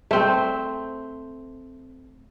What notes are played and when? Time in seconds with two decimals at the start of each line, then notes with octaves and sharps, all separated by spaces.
0.11 A3 C4